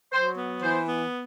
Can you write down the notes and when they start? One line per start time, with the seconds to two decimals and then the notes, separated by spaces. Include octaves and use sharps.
0.12 F#3 C5
0.38 B3
0.62 E3 C5
0.87 B3